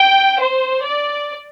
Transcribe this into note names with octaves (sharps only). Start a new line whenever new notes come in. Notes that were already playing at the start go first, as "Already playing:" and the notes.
Already playing: G5
C5
D5